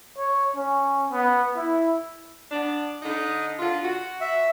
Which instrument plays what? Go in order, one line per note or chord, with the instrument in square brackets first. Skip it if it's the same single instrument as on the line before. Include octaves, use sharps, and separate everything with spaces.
[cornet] C#5
C#4
B3
E4
[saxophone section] B3 D4
D3 D#4
D3 F4
F#4
[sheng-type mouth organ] E5